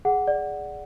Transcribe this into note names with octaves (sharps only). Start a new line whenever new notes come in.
G#4 F#5
D5